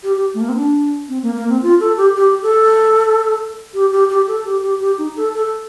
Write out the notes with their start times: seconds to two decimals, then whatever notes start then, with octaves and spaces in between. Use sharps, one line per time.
0.03 G4
0.17 G4
0.34 A3
0.41 A#3
0.49 C4
0.56 D4
1.09 C4
1.23 A#3
1.35 A#3
1.49 C4
1.63 F4
1.80 A4
1.97 G4
2.16 G4
2.42 A4
3.74 G4
3.92 G4
4.10 G4
4.28 A4
4.45 G4
4.63 G4
4.80 G4
4.98 D#4
5.16 A4
5.34 A4